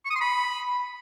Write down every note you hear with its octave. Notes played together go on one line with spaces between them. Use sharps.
C#6
D#6
C6
B5